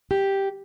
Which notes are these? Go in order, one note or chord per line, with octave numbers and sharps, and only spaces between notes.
G4